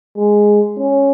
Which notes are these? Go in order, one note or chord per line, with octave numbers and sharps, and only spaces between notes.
G#3
C#4